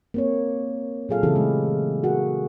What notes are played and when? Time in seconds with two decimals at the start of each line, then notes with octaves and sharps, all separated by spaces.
0.14 A#3 C4 C#5
1.09 A#2 F#3 F4 G#4 A4 F5
1.23 C#3 E3 C4 E4 G4 A4
1.35 G#3 A3
2.04 F#4 G#4 A#4 F#5